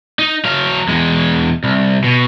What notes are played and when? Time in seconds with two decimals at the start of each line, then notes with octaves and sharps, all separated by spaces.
0.19 D#4
0.44 F#3 F5
0.88 E2 G#3
1.64 C2
2.04 B2